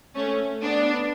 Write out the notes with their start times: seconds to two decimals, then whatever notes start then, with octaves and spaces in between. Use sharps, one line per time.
0.15 A3 C#4
0.63 B3 D4